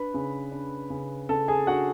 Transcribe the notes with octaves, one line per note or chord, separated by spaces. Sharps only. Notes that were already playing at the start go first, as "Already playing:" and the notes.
Already playing: D4 B4 B5
C#3
D4
C#3
C#3 A4 A5
G#4 G#5
D4 F#4 F#5